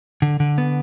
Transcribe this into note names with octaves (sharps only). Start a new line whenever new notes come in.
D3
D3
B3